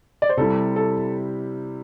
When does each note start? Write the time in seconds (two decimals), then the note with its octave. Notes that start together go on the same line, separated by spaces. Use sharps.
0.22 D5
0.29 C5
0.37 C3 G3 E4 A4
0.76 A4